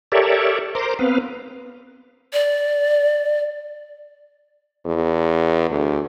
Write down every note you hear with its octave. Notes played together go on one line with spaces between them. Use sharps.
G4 A4 A#4 C#5 D5 E5
A#4 C5 A#5 C6 D6
B3 C4 B4 F5
D5
E2
D2